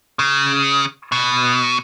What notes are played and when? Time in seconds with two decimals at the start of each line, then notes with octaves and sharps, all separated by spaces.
0.19 C#3
1.12 B2